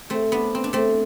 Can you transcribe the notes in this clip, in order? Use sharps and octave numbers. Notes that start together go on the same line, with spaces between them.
A3 C4
B3 D4
C4
D4
A3 C4